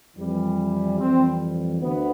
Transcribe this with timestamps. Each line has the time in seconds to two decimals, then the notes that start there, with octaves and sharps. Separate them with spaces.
0.17 F2 E3 G3
0.99 F2 E3 G3 C4
1.81 D2 D3 B3